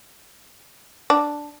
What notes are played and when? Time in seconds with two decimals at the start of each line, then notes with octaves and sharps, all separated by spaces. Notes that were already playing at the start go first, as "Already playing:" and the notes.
1.10 D4